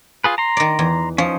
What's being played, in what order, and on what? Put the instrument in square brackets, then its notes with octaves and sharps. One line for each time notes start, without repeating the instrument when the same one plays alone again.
[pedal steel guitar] F4 G#4 B4
A#5 C6
[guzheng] D#3 D5
E2
[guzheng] F3 [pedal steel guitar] C#4 D#4